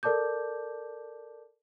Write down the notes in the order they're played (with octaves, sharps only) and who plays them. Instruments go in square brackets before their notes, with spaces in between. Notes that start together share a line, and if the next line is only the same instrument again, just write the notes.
[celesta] A4 A#4 D5 A5 D6 G6